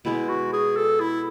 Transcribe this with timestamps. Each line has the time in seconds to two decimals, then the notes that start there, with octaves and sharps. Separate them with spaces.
0.05 B2 G#3 B3 E4
0.29 F#4
0.53 G#4
0.76 A4
1.00 E4